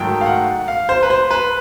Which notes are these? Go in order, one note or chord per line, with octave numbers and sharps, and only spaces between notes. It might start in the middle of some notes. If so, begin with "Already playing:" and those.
Already playing: G#2 D#3 F#3 A3 G5
F5
F#5
F5
C5
B4
C5
B4